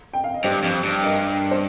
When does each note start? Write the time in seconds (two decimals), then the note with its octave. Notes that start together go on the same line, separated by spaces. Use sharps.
0.13 G5
0.24 F5
0.34 D#5
0.44 G2 G4 C5
0.64 F2
0.84 G2
1.03 A#4 D#5
1.51 C5